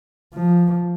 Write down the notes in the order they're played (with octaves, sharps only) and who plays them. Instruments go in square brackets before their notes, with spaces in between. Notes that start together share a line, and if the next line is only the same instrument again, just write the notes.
[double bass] F3